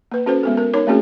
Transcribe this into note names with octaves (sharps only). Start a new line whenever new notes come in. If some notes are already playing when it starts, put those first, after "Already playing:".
A#3 B4
C#4 F#4 A4 B4 C5
G#3 B3 A4
A#4
D#4 A#4 C#5 D6
A3 A#3 C4 C#4 F#4 G#4